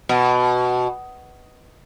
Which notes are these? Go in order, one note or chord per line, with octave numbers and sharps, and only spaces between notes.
B2